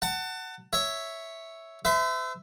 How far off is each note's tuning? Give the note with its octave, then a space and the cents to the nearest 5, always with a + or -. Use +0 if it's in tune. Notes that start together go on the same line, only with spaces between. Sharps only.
F#5 +15 A5 +25
C#5 +0 E5 +0
C5 -45 E5 +0